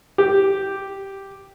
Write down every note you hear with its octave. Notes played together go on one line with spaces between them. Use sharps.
G4